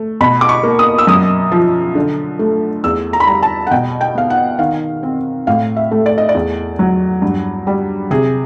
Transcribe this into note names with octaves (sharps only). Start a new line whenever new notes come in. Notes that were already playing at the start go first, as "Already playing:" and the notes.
Already playing: A3
B2 B5
D6
C#6
A#3
D#6
E6
F#2 D#6
F3
D3
A3
E2 E6
A#5
B5
G3 A#5
A5
F#5
B2 G5
G5
B3 F5
F#5
D#3 F5
C4
A2 F5
E5
A3
D5
D#5
D5
E2
F#3
G2
G3
C3 G#4